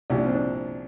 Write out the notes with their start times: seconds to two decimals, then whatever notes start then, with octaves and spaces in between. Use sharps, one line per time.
0.10 C2 A#2 F3 G4
0.18 D4
0.26 C4
0.34 D4